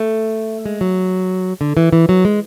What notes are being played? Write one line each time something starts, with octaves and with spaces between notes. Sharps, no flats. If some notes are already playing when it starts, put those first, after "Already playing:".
Already playing: A3
G#3
F#3
D3
E3
E3
F#3
G#3